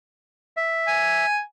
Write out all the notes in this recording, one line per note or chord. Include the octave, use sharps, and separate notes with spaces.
E5
G#5